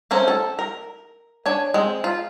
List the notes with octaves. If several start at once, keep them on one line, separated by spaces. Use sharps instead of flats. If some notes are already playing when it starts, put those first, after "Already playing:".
A3 C4 C#4 A#4
A4
A#4
D4 C#5 G#5
G#3 C4
F4